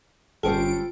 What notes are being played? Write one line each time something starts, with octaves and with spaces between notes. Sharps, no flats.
G1 G3 C#4 F4 A4 C5 G5 D7